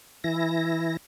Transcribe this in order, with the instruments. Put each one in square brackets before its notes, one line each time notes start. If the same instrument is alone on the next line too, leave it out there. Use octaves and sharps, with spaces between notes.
[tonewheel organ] E3 E4 A#6